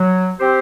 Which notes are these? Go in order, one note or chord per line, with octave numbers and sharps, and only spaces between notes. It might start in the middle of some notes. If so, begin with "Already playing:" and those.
Already playing: F#3
C4 G4 C5